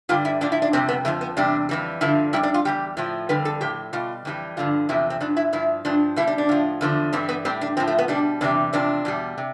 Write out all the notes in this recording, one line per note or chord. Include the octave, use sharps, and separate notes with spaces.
G2 D3 G3 F4
E4
A2 F3 D4
E4
D4
F2 C3 G3 C4
B3
F2 D3 F3 A3
B3
E2 C3 G3 D4
F2 E3 G3
G2 D3 F3 E4
F2 C3 G3 E4
D4
F4
E2 C3 G3 G4
A2 F3
F2 D3 G3 B4
A4
A2 F3 G4
B2 G3 F4
F2 E3 G3
G2 D3 F3 F4
E2 C3 F3 E4
C4
G2 F3 D4
E4
G2 F3 E4
G2 F3 D4
B2 G3 E4
D4
D4
A2 F3
E2 D3 F3
G2 E3 G3 C4
B3
A2 G3 C4
D4
A2 F3 C4
A3
B3
B2 G3 D4
E2 C3 E3 G3 D4
E2 C3 F3 D4
E2 B2 G3
C3